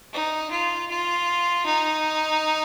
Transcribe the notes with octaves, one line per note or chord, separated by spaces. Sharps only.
D#4
F4
F4
D#4